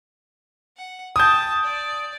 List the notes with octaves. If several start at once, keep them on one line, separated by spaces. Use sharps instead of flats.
F#5
G5 A5 D#6 G6
D5